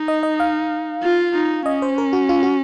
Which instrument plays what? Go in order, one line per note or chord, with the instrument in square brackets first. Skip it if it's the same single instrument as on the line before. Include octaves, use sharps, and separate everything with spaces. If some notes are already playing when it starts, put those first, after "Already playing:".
Already playing: [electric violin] D#4
[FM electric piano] D#5
D#5
F5
[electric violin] F4
D#4
[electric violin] C#4 [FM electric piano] D#5
[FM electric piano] C5
A#4
F#4
F4
F#4